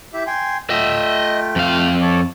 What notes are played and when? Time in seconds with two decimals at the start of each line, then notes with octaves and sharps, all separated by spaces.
0.13 E4 G4 E5
0.27 G5 G#5 C6
0.70 A3 F4 D#5 E5 G5
1.56 F2 F5
2.01 A4 C#5 D6